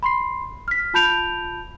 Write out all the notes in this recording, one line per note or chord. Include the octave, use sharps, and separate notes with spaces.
B5 C6 C7
F6 B6
F4 A5 B5 G6 D7 F7